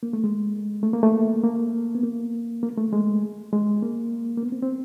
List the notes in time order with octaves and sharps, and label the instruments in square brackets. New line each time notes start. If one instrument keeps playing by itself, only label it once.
[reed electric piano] A#3
A3
G#3
A3
A#3
A3
A#3
B3
A#3
A#3
A3
G#3
G#3
A#3
A#3
B3
C4
C4